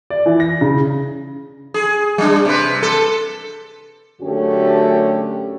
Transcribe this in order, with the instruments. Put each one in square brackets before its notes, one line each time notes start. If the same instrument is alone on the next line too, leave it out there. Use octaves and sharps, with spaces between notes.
[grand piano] D5
E3
A#6
C#3
[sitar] G#4
G3 D4
C3 B4
A4
[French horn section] F#2 D3 A3 C#4 F#4 G4